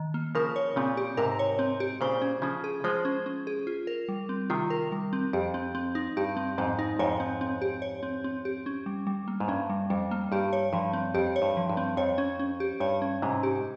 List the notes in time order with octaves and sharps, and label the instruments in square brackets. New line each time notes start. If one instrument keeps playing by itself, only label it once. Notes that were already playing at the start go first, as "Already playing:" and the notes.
Already playing: [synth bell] D#3
A#3
[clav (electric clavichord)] C#3 F3 [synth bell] A#4
[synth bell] C#5
[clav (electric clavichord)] A#2 C#3 [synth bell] C4
[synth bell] G4
[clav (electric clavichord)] G#2 C3 [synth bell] A#4
[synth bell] C#5
C4
G4
[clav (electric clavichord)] A#2 C#3 [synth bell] C5
[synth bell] C#4
[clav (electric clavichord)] C#3 F3 [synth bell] C#4
[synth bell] G#4
[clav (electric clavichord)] F3 G#3 [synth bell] C5
[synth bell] C#4
C#4
G#4
F4
A#4
G3
C4
[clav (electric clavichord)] C3 D#3 [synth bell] F4
[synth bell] A#4
G3
C4
[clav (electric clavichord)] F2 [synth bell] G4
[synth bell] C4
C4
D#4
[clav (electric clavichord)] G2 [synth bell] G4
[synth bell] C4
[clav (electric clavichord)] F2 G#2 [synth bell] C4
[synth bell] D#4
[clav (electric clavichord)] F2 G#2 [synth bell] C#5
[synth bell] C4
C4
G4
C#5
C4
C4
G4
C#4
G3
G3
A#3
[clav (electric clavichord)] G#2
[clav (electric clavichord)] G2 [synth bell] C#4
[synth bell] G3
[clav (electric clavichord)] F2 [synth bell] G3
[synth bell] A#3
[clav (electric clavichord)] G2 [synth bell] G4
[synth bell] C#5
[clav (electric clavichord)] G2 [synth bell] F3
[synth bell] C4
[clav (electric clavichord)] F2 [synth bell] G4
[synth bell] C#5
[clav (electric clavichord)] G2
[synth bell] F3
[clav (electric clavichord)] G2
[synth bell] C4
[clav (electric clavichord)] F2 [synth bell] C#5
[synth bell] C#4
C#4
G4
[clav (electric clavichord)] G2 [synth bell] C#5
[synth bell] C#4
[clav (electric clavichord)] G#2 C3 [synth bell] C#4
[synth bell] G4